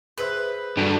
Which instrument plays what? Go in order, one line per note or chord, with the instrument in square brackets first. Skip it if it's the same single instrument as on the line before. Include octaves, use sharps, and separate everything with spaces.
[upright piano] G#4 C5 [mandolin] B4 E5
[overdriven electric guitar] G2 [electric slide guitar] D4 F#4 A4